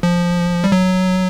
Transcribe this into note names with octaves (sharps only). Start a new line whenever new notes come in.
F3
G3
F#3